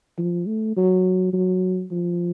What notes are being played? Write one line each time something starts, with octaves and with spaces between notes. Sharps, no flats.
F3
A3
F#3
F#3
F3